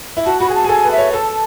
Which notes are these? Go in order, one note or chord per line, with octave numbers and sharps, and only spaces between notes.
E4
F#4 A5
F#4 B5
G#4 G#5
A5
G#4
A4 G#5
B4
E5
C#5
A4 A5